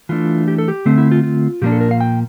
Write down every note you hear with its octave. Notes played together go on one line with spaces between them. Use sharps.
E3 A3 D4 F4
G4
A4
G4
D3 A3 C4
E4
F4
F4
A#2 F3 A#3 D4 G4
A4
A#4
F5
G5